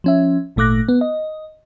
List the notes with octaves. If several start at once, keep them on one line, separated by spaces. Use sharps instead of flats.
F3 C#4 E5
G#1 A#2 A3 D6 F#6 A#6
B3
D#5